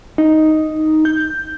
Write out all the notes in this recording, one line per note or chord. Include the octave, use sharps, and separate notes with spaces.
D#4
G6